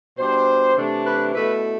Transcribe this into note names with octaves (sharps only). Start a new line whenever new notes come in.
B2 G3 D4 C5
C3 E3 A3 D4
B4
B2 A3 E4 B4